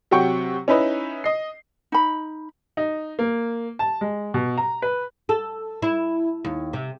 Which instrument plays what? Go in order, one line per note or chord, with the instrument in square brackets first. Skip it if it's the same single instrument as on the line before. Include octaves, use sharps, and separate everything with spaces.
[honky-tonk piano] C3 F#3 F#5 G5 C#6 C#7
C#4 D#4 E4 B4 D#5
D#5 C7
[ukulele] D#4 B5
[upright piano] D#4
A#3
A5
G#3
B2
A#5
B4
[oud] A4
E4
D#2
C3